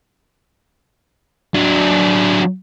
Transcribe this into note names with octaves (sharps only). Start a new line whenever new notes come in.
F#3 D4